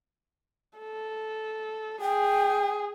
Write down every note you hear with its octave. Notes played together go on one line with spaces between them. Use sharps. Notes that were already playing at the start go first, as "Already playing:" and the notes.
A4
G#4 G5